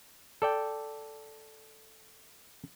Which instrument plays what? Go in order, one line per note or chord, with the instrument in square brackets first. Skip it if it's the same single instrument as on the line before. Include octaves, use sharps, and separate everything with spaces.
[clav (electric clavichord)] A4 D5 G5